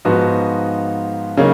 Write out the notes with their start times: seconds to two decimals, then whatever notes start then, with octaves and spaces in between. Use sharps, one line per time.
0.05 G#2 F3 B3 D#4 F#4
1.37 C#3 F#3 A#3 D#4